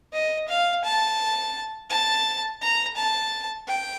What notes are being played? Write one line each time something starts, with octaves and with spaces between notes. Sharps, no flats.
D#5
F5
A5
A5
A#5
A5
G5